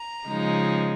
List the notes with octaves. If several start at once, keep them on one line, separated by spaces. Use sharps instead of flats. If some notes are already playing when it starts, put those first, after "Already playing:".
Already playing: A#5
C#3 F3 G#3 D#4